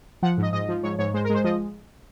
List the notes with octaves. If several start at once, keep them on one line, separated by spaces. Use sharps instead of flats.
F3 F#5
G#2
D#5
G#2 D#5
F3
G#2 C#5
G#2 C#5
G#3 C5
A#4
G#3 C5
F3 D#5